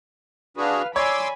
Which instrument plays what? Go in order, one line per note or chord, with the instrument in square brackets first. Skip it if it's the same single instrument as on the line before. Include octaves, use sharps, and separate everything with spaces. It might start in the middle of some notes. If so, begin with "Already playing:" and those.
[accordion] D4 F#4 G#4 [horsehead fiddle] B4 F5
[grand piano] C#5 D5 [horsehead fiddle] G#5 B5 [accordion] C6 D6 E6